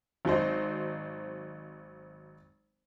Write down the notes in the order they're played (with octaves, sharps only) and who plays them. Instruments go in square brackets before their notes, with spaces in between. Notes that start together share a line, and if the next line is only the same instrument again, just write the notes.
[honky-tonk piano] G#1 F#3 D#4 C5